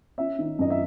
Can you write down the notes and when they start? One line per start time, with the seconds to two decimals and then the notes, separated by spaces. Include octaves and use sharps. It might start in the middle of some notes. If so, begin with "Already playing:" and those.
0.18 C#4 E5
0.39 D#3
0.59 F#2 D#5
0.70 E5